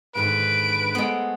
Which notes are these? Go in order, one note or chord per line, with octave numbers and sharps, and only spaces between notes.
G#2 D3 D#3 B4 D7
G#3 A3 B3 C5